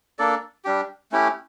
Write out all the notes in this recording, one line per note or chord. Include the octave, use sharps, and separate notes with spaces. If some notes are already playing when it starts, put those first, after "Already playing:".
A#3 D4 A4 D5
G3 D4 G4
A3 C#4 E4 G4